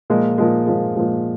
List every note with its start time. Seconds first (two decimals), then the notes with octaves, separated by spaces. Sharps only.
0.10 A#2 F3 G#3
0.38 A#2 F3 G#3
0.67 A#2 F3 G#3
0.95 A#2 F3 G#3